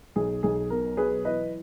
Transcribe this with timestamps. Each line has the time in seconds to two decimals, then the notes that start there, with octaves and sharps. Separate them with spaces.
0.16 B1 G#4
0.43 B1 G#4
0.70 B2 A#4
0.97 F#3 G#4 B4
1.25 E3 B4 D#5